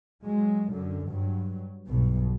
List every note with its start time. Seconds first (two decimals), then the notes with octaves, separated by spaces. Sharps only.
0.24 F#3 G#3
0.71 F#2 D3
1.08 G2 F#3
1.88 B1 G2 B2